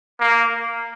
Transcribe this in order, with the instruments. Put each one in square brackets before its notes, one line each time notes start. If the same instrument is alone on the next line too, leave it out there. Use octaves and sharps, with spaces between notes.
[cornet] A#3